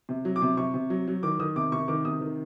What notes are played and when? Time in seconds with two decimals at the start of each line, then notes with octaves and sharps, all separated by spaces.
0.09 C3
0.25 F#3
0.36 D6
0.42 C3
0.57 C3 C#6
0.74 C3
0.90 F#3
1.08 F#3
1.23 D#3 D6
1.40 D#3 D#6
1.56 C3 D6
1.72 C3 C#6
1.88 D#3 D6
2.05 C3 D#6
2.21 D#3